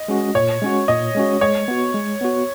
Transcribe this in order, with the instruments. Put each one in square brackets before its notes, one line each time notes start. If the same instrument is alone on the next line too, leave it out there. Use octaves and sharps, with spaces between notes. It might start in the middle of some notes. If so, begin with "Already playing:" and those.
Already playing: [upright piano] D#5
[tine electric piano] G#3 C#4 F#4
[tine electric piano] A#2 [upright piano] C#5
[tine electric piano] G#3 C#4 F#4
[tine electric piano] A#2 [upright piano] D#5
[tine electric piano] G#3 C#4 F#4
[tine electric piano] G#3 [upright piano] C#5
[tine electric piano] B3 F#4
G#3
B3 F#4